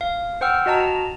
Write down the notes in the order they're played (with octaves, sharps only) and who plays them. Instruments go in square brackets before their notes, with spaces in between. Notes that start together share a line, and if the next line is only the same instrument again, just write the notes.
[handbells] F5
C5 F#5 G5 E6 F6
F#4 D#5 A5 A#5